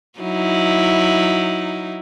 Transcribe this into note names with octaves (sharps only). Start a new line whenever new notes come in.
F#3 D#4 E4